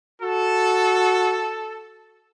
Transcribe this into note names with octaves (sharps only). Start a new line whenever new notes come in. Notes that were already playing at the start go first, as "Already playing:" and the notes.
F#4 A4